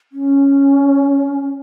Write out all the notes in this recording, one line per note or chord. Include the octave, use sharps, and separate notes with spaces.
C#4